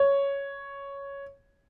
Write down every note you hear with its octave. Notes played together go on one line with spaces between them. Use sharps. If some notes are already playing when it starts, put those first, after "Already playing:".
Already playing: C#5